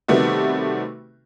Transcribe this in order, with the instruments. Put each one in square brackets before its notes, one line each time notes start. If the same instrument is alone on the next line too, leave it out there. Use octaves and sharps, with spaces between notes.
[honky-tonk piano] C3 D#3 G3 A3 B3 F#4